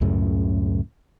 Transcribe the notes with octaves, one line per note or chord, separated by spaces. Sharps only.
C#2 F#2 A2 C#3